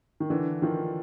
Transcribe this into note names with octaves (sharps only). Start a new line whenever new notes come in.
D#3
D3 E3
D#3 F3